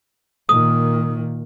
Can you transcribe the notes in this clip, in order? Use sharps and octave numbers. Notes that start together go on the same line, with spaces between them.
A#2 D#3 D#6